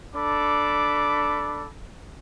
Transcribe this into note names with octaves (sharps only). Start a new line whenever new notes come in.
D4 A4 B5 D6